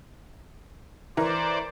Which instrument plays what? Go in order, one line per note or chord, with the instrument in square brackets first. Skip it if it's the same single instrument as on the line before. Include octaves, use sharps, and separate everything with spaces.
[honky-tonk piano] E3 A#4 [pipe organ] C5 D5